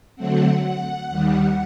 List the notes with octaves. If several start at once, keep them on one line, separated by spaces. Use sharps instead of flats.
D3 F#3 A3 C4 F#5
F#5
D#2 D#3 G3